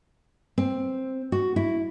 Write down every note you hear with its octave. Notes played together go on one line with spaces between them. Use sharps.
C4
F#4
E4